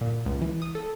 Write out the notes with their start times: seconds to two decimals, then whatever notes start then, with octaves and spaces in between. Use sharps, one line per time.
0.01 A#2
0.26 C#2
0.41 E3
0.62 D#6
0.75 A4